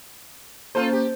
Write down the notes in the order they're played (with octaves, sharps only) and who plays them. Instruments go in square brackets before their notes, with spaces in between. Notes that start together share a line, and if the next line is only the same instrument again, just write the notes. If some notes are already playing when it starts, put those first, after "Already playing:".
[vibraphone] A#3 C#4 [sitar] F4 A4 C5
[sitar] G4